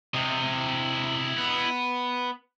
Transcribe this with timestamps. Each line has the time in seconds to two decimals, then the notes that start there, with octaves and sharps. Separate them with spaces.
0.14 C3 E4 D#5
1.38 B3